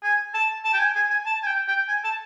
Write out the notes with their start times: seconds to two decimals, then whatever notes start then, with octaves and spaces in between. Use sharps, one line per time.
0.03 G#5
0.34 A5
0.65 A5
0.74 G5
0.80 G#5
0.96 G#5
1.10 G#5
1.26 A5
1.43 G#5
1.46 G5
1.68 G5
1.88 G#5
2.04 A5